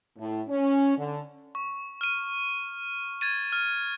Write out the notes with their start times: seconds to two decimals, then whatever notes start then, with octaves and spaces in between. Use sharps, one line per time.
0.18 A2
0.48 C#4
0.97 D3
1.55 C#6
2.01 F6 D#7
3.21 G#6 A6 D#7
3.53 F6